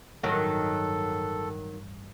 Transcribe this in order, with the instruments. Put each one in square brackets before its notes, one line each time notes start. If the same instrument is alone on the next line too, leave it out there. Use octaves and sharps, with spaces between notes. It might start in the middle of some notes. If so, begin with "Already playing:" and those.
[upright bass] A1 G2 [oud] D#3 F#3 F#4 [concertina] A4